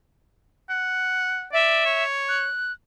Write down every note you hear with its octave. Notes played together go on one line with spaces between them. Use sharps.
F#5
D5 E5
C#5
F#6